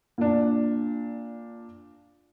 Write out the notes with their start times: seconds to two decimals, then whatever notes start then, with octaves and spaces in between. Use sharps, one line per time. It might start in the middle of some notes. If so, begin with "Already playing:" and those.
0.18 A#2 D4